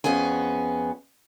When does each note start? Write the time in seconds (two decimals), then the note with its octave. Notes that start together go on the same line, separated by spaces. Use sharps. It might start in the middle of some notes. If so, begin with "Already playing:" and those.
0.04 F2 B3 C#4 G#4 G#5